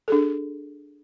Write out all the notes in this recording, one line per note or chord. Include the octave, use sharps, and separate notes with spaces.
D4 G#4 A4